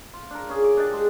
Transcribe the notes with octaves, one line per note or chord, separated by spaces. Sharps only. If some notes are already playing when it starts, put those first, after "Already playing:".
F4
D4 A#4
C#4 G#4
D6
D4 G4 D#5 A5
G#3